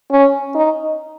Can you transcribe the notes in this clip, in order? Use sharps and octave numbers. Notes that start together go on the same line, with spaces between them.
C#4
D#4